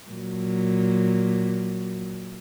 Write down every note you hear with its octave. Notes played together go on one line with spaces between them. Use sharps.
A#2 F#3